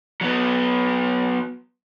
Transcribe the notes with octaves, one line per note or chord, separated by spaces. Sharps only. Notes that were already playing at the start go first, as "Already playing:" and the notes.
F#3 B3